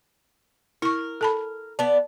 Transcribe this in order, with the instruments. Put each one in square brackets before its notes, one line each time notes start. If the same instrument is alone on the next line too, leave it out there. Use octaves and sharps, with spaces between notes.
[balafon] E4 C#6 [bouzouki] A#4
[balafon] A4 A5 B5
[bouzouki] B3 D5 [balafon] A5